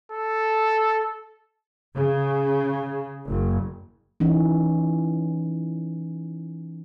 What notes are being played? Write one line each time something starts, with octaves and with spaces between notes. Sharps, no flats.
A4
C#3
F#1
E3 C#4 D#4